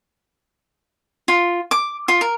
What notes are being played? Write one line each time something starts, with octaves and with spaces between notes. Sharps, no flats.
F4
D6
F4
A#4